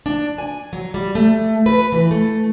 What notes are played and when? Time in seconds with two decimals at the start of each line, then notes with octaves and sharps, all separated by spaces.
0.06 D4
0.38 G#5
0.73 F#3
0.94 G3
1.15 A3
1.66 B4
1.92 E3
2.11 A3